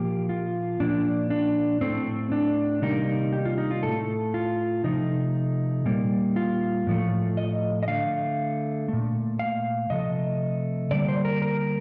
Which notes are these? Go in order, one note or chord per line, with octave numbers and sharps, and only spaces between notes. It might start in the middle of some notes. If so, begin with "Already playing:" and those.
Already playing: A#2 F3 A#3 G4
F4
A#2 F3 A#3 D4
D4
A2 A3 C4
D4
C3 D#3 G3 A#3 D#4
G4
F4
D#4
F4
A2 A3 A4
F4
C3 F3 A3 D#4
A#2 G3 A#3
F4
A2 F3 A3
D#5
D#5
D3 A3 F5
A#2 A3
F5
C3 F3 A3 D#5
D3 G3 A#3 D5
C5
A#4
A#4